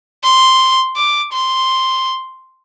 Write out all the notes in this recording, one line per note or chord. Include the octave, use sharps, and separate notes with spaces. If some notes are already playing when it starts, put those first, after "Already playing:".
C6
D6
C6